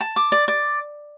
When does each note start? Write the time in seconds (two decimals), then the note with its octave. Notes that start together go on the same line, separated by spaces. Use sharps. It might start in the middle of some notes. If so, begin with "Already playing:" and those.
0.01 A5
0.16 D6
0.32 D5
0.48 D5